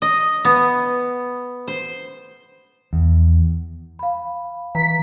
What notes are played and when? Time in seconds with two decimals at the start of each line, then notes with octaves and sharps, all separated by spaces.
0.02 D#5
0.45 B3
1.68 C5
2.93 E2
3.99 F5 B5
4.75 E3 A#5 B6